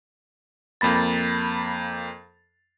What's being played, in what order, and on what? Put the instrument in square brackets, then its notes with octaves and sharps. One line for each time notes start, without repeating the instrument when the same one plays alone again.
[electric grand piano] F2 A#3 B5 A6